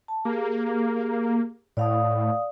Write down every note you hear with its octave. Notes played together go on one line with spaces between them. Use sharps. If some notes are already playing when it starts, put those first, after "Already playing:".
A5
A#3 G4 G#4
A2 D5 F5 D#6